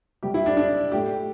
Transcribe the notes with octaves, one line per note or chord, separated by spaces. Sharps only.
C3 G3 G4
E4
D4
D4
A2 A3 G4